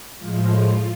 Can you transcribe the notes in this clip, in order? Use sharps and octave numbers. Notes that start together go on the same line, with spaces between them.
A2 F3 G#3 F4